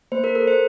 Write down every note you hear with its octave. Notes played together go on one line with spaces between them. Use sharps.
A#3 C5
A#4
A4 A#4
C5